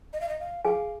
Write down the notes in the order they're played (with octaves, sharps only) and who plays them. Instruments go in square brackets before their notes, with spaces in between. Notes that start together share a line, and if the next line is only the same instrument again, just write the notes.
[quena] D#5
F5
D#5
F5
[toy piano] G#4 G#5 [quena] F5